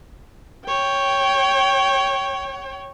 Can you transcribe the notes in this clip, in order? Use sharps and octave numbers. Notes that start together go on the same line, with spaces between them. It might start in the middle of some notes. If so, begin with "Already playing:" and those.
C#5 G5